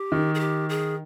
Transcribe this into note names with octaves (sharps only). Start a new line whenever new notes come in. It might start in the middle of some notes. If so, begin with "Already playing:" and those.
Already playing: G4
D#3
G#4
G4
G#4